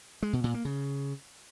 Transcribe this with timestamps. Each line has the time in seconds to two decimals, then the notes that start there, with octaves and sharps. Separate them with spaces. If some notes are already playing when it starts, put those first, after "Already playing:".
0.22 G#3
0.33 B2
0.44 A#2
0.54 A#3
0.65 C#3